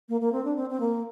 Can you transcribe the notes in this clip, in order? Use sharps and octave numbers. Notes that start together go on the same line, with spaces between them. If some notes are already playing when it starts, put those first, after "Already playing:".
A#3
A#3
C4
D4
C4
C4
A#3